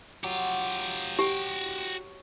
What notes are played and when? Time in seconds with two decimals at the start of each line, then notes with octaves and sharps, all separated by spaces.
0.24 F#3 F4 G4
1.19 F#4 G4 G5